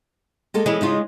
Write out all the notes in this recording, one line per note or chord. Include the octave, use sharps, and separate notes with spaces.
G#3 A#3 A4
E3 G#3 C#4 E4
C#3 D#4 F4